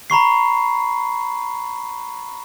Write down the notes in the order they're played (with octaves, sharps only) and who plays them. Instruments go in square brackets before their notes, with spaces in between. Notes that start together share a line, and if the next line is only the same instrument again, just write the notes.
[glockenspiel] A#5 B5 C#6 C7